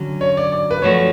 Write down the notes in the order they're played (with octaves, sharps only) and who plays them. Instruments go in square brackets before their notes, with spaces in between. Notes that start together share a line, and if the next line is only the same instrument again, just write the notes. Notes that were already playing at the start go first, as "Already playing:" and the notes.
Already playing: [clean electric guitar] D3 F#3 C#4
[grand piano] C#5
D5
D5
B4
[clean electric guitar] F#2 F3 A3 C#4 F#4 [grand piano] C#5